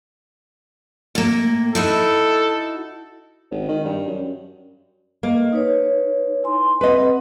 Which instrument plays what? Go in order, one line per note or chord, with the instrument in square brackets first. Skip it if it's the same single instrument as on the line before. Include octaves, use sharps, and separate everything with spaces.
[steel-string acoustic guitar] A2 A#3
[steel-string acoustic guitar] D#4 E4 F#4 [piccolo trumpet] A4
[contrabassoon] G#1
D#3
G2
F#2
[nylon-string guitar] A#3 [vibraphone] D#5
[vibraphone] D#4 B4 C#5
E4 G#5 C6
[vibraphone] C4 F#5 [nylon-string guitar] B4 D#5